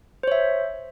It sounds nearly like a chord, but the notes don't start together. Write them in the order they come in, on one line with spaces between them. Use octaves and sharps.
C5 C#5 E5